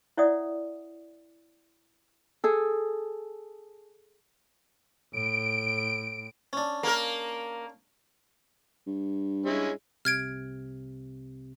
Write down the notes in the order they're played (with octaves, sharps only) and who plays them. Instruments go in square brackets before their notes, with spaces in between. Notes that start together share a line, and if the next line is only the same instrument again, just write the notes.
[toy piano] E4 C#5 D5 E5 F#5 D#6
[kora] G#4 A4
[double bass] A2 [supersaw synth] D7
[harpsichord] C#4 D4
[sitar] A#3 A#4
[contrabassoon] G2
[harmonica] G#3 C#4 E4
[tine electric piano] C2 C3 [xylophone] F6 G#6 D7